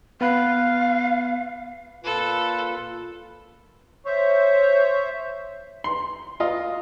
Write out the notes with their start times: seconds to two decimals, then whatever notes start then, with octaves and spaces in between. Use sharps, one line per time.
0.21 B3 F5 B5 F#6
2.04 A#2 F4 A4 B4
4.06 C5 C#5 E5
5.84 C6
6.40 F4 D#5